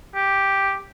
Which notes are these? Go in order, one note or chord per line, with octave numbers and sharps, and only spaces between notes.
G4